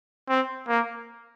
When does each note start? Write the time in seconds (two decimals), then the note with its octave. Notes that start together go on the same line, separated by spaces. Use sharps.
0.28 C4
0.68 A#3